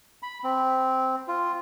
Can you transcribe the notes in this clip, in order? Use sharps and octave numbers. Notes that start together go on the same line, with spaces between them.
B5
C4
F4